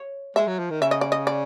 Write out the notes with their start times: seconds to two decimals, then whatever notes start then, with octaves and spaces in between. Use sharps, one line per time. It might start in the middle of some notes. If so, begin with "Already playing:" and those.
Already playing: C#5
0.36 G#3 E5
0.47 F#3
0.59 F3
0.70 D#3
0.82 C#3 E5
0.91 D#5
1.01 D5
1.12 D#5
1.27 D5